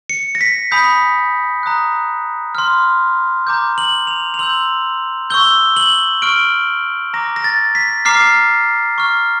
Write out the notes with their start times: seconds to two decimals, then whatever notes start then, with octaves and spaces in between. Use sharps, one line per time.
0.10 C#7
0.35 A#6
0.41 B6
0.71 G#5 B5 D#6 G6 B6
1.63 A#5 D#6 F#6
2.55 C6 F6
3.47 A#5 D6 G6
3.78 F#7
4.07 F7
4.34 F7
4.39 C6 E6 G6 F#7
5.30 C#6 E6 G6 G7
5.76 F#7
6.22 C#6 F6 D7
7.13 A#5 D6 F6 A#6
7.36 A#6
7.44 A6
7.75 B6
8.05 A#5 D6 F6 C7
8.98 C#6 F6